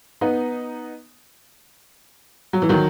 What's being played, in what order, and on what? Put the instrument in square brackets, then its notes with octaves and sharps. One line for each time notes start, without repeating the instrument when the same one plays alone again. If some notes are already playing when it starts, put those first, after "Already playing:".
[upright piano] B3 D#4
F#3
E3
D#3 F#3